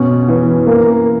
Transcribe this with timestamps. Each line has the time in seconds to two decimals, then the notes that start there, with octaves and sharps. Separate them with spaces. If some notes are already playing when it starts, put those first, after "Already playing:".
Already playing: B2 C#4
0.28 E3
0.67 A#3